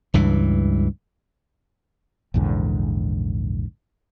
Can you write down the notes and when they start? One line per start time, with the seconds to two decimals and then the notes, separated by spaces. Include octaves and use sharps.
0.14 C#2 G2 E3
2.34 A#1 E2 G#2 D3